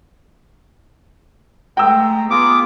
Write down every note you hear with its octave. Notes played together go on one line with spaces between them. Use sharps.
G#3 A3 G5 A#5 E6
B3 F4 G#4 D6